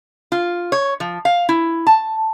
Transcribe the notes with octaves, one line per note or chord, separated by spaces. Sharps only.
F4
C#5
F3
F5
E4
A5